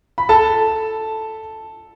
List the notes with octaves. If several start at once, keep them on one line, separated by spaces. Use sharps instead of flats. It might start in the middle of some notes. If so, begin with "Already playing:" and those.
B5
A4 A5